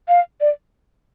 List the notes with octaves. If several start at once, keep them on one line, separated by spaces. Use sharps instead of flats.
F5
D5